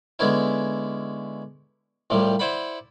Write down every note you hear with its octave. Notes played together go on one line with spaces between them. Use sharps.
D3 G#3 B3 C#4 E4
C2 A2 C3 F3 G3
E4 C5 D5 F#5 B5